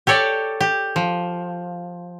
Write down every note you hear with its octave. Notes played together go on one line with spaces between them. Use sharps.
G4 A4 C#5 D5
G4
F3